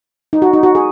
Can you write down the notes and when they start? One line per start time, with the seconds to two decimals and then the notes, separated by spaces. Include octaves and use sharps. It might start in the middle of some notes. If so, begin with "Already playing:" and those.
0.33 D#4
0.42 F#4
0.53 D#4
0.63 F#4
0.75 G#4